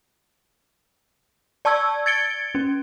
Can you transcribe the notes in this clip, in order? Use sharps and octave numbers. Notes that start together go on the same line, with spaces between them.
D5 A5 C#6 E6 G#6
G#6 A6 C#7 D7 G7
C#4